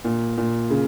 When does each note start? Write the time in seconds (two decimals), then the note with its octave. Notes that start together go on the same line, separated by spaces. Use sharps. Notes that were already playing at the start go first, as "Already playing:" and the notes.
0.05 A#2
0.38 A#2
0.70 C#3